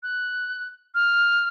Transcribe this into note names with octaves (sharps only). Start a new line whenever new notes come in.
F#6
F6